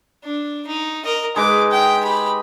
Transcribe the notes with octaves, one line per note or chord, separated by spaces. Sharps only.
D4
D#4
A#4 D#5
G#3 D#4 B4 D6
G5
G4 B5